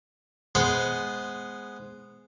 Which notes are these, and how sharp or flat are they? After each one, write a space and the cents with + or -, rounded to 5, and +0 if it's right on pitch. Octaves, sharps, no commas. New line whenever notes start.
G#3 +0 B3 +0 C5 +0